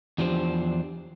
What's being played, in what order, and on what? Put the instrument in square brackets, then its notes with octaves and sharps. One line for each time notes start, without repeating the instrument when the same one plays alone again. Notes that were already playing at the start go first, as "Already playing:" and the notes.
[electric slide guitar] E2 F3 D4 G4 C5